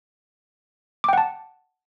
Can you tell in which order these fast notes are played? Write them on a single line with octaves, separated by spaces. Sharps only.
D6 G5 F#5 A5